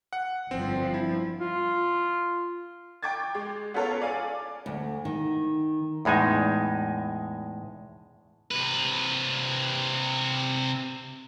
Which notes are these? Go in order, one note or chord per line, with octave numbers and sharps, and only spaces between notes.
F#5
G1 F3 C4
E4
F4
G5 C#6 D6 G#6 A6
G#3
B3 C#4 F4 A4 A#4 C#5
D5 F5 G#5 D6
D2
D#3
E2 A2 G#3 D#4 G#5
C3 B4